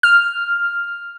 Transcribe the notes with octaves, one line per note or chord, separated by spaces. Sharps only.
F6